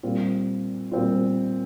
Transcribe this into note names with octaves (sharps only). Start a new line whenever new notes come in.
A#2 G3 C4 F4
A#2 G3 C4 F4